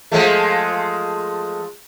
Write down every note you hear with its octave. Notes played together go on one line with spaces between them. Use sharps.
F3 G#3 A3